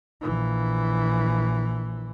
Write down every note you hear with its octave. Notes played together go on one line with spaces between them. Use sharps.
A#1 E3